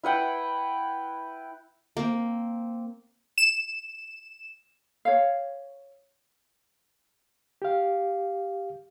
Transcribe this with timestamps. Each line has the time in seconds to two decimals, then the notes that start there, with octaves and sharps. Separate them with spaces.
0.03 E4 B4 F#5 G5
1.97 A#3 C4
3.38 E7
5.05 C#5 F5
7.62 G4 F5